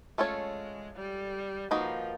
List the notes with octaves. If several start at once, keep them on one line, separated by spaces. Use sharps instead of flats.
G#3 A3 C#4 F4 A4 C#5
G3
F3 A#3 D#4 F#4 B4